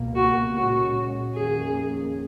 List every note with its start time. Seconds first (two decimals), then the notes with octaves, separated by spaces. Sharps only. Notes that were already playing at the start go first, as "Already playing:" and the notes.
Already playing: C#2 B2 A#3
0.15 F#4
0.55 A#2 G#3 C#4 F#4
1.34 F2 D#3 A#3 C#4 G#4